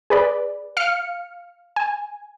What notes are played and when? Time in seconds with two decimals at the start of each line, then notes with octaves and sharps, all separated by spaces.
0.10 G#4 B4 D5
0.77 F5 F6 C#7
1.76 G#5